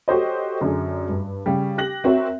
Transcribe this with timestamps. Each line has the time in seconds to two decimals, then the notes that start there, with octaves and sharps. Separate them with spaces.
0.08 F#4 G4 A4 C5 C#5 D#5
0.61 F#2 D3 D4 G#4
1.09 G2
1.46 C#3 G3
1.78 G4 F#6 A#6 F#7
2.04 C4 F#4 A#4 C#5 E5